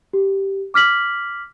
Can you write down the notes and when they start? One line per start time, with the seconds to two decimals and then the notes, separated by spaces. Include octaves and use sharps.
0.13 G4
0.74 D6 F6 B6 F#7